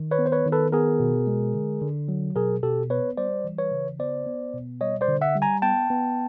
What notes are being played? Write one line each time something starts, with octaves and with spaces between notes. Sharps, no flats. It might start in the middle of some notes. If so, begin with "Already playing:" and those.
Already playing: D#3
B4 C#5
B3
C5
B4 C#5
D#3
A4 B4
B3 G#4 A#4
B2
G#3
D3
D3
F#3
B2 G#4 A#4
B2 G4 A4
B3 B4 C#5
G3 C5 D5
E3
B4 C#5
C#3
B3 C5 D5
B3
B2
G3 C#5 D#5
C5 D5
D3
E5 F#5
G3
G#5 A#5
B3 G5 A5
B3